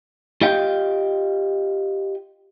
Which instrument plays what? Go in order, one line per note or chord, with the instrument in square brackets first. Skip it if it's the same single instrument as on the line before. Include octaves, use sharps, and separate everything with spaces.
[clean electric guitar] F4 G4 D#5 F5 G5